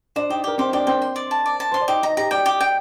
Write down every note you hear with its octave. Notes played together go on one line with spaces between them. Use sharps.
D4 C5 D5
D#4 G4 D#5
G4 A#4
C4 G4 C5
D4 G4 D5
C4 C5 G5
C6
D5
A5
D5
A5
C5 C6
D5
D#4 G4 D#5
D#4 D#5 A#5
G4 G5 A#5
D5 G5 D6
G4
G5